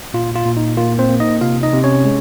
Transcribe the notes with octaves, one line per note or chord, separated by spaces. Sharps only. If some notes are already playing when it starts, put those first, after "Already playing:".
A#2 F4
F4
A#2
D#4
A#3 F4
C4 C5
A#3
D#4 D#5
C3 F4 F5
D#4 D#5
C3
C#4 C#5
G#3